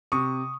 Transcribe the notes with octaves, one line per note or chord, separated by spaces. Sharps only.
C3 C#6 D#6